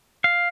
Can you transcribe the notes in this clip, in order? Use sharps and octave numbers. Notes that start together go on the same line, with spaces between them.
F5